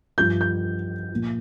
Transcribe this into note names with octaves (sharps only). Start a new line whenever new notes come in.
G2 F3 G6
G6
A#2 F3